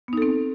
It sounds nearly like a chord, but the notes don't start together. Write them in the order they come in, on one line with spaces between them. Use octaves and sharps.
B3 D#4 A4 C4